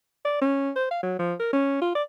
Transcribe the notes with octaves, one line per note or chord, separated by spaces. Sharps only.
D5
C#4
C5
F5
F#3
F3
A#4
C#4
F4
D5